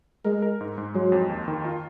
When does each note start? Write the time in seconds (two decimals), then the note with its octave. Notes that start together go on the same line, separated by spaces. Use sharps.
0.25 G#3 A#4
0.42 A#4
0.61 G#2
0.78 G#2
0.94 F#3 G#3
1.12 F2
1.29 D#2
1.48 D#3
1.65 F4